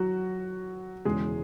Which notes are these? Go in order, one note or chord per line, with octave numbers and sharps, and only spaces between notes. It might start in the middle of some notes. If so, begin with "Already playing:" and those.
Already playing: F#3 F#4
E1 E2 C#3 G#3 G#4